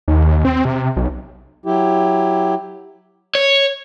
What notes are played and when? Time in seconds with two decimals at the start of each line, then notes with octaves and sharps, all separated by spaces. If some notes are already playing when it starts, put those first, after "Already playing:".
0.08 D#2
0.45 C4
0.65 C3
0.96 B1
1.66 F#3 E4 G4
3.35 C#5